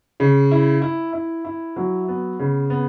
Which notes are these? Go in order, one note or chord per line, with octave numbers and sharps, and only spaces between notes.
C#3
E4
E4
E4
E4
F#3
B3
C#3
B3